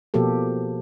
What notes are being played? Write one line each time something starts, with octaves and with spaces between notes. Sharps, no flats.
B2 F3 A#3 G4 A4